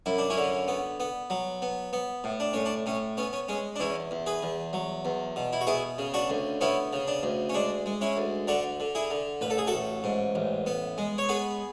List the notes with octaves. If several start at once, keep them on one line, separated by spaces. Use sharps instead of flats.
F#2 E4
D4
C#4 E4
D3
B3
B3
F#3
B3
B3
A2
D4
A2 C#4
D4
A2 C#4
B3 C#4
C#4
G#3 C#4
D4
E2 C#4 E4
E2
G#4 B4
E2
F#3
E2
B2
E4
F#4
B3 E4 G#4
C#3
D4 F#4
D2
B3 C#4 E4
C#3
D4
D2
C#4
G#3 D4
G#3
C#4 E4
D2
D3 D4 F#4
D3
E4 G#4
D3
A1 B4
A4
G#4
F#4 A4
A1
G#2
A1
B3
G#3
C#5
B3 G#4 B4